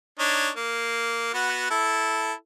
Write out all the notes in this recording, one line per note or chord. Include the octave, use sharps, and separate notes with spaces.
D4 D#4 C#5
A#3
B3 F#4
E4 A4